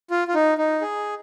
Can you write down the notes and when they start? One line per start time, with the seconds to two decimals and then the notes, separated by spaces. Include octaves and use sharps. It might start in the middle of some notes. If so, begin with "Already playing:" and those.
0.10 F4
0.28 F4
0.34 D#4
0.58 D#4
0.81 G#4